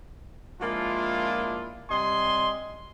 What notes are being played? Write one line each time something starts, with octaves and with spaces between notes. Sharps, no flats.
F3 G#3 A#3 D4 E4 F4
C3 G3 D#5 G#5 C6